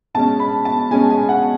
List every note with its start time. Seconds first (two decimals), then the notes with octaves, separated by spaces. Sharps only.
0.14 B2 G#3 C#4 A5
0.40 B5
0.65 A5
0.91 B2 G#3 C#4 G#5
1.10 G#5
1.29 F#5